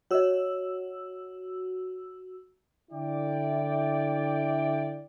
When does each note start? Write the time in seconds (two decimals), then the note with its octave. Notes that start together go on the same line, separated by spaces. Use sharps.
0.11 F#4 C#5 D#5 E6
2.92 D3 E4 D5 G5